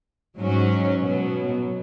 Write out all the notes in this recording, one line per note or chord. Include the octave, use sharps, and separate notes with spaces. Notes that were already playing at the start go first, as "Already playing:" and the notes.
G#2 F#3 C#4
B2 F#3 B3